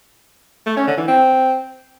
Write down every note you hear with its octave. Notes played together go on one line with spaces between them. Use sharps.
A3
C#4
D3
E3
C4